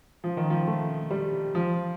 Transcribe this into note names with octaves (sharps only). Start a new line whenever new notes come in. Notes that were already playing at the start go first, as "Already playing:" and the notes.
F3
D#3
F3
A3
G3
F3